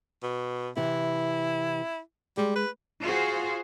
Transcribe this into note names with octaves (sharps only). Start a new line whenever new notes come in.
B2
C3 E3 E4
G3 G#3
B4
F4 F#4 G#4 C5